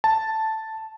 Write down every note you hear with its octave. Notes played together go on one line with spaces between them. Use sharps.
A5